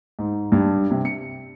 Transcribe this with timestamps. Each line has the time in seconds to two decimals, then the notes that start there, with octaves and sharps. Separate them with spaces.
0.19 G#2
0.52 G2
0.91 C3
1.05 C#7